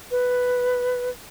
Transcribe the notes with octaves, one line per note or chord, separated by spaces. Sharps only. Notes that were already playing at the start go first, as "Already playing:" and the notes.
B4